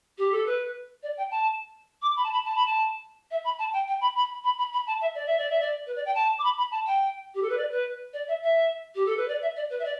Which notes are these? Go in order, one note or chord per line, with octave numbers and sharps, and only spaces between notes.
G4
A4
B4
D5
G5
A5
D6
B5
A5
B5
A5
B5
A5
E5
B5
A5
G5
G5
B5
B5
B5
B5
B5
A5
E5
D5
E5
D5
E5
D5
B4
D5
G5
A5
D6
B5
B5
A5
G5
G4
A4
B4
D5
B4
D5
E5
E5
G4
A4
B4
D5
E5
D5
B4
E5
D5